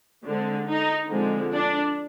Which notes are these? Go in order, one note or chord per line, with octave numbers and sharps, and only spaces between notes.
D3 G#3 C4
D#4
D3 F3 G#3 C4
D4